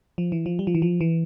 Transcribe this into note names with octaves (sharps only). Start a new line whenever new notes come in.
F3
E3
F3
G3
F3
E3
F3
E3